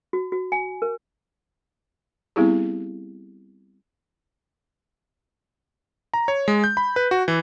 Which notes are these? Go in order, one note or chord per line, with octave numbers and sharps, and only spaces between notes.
F#4
F#4
G#5
A#4
G3 B3 C4 E4 G4 G#4
A#5
C#5
G#3
G6
B5
B4
F#4
E3